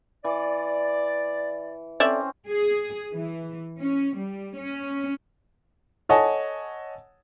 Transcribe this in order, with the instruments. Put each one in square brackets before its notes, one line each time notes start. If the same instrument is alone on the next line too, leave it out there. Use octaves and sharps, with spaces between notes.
[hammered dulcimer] E3 [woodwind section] D5
[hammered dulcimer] C4 C#4 [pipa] A4 D5 E5
[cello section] G#4
E3
C#4
G3
C#4
[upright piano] A4 C#5 D#5 F#5 G#5 A5